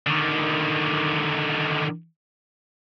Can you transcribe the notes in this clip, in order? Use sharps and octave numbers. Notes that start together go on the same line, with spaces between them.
D3 D#3